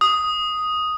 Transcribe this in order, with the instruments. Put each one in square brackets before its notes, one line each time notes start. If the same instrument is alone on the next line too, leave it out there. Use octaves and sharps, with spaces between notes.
[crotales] D#6